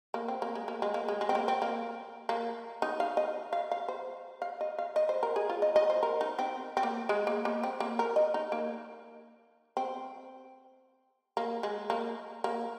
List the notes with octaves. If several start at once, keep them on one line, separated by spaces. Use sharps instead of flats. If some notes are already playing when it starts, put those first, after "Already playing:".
A#3
C4
A#3
G#3
A#3
G#3
A#3
G#3
G#3
C4
A#3
C4
A#3
A#3
D#4
F5
D#5
F5
F5
C5
F5
D#5
F5
D#5
C5
A#4
G#4
F4
D#5
D#5
C5
A#4
D#4
C4
C4
A#3
G#3
A#3
A#3
C4
A#3
A#4
D#5
D#4
A#3
C4
A#3
G#3
A#3
A#3